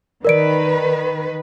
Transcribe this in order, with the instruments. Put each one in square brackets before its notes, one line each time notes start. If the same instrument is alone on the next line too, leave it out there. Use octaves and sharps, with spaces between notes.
[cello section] D#3 B4 [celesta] A#4 D5 D7